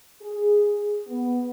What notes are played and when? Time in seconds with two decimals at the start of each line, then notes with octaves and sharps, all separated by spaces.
0.22 G#4
1.06 B3